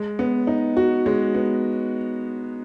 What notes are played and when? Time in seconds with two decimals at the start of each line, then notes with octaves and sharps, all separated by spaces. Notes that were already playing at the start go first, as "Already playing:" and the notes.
Already playing: G#3
0.19 B3
0.47 D#4
0.77 F#4
1.06 G#3
1.34 B3